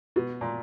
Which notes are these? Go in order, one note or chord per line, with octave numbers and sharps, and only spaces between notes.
B2
A#2